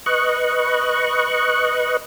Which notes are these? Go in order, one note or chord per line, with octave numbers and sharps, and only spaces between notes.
B4 D#5 C#6 F#6